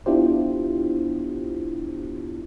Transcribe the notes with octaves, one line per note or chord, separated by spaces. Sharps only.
B3 D4 E4 F4 G4 C5